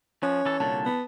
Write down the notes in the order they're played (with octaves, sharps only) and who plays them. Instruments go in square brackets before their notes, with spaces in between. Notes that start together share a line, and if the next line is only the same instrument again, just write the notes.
[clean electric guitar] F3 [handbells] C#4 [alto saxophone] C#5
[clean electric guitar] E3 A4
[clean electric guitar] C2 A#2 D3 [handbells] A5
[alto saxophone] B3